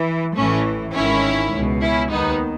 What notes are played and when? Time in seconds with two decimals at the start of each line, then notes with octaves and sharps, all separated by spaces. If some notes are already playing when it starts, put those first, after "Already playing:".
Already playing: E3
0.36 A1 A2 E3 A3 C#4
0.94 G#1 G#2 D#3 C#4 E4
1.52 C#2 B2
1.82 C#4 E4
2.10 D#2 D#3 B3 D#4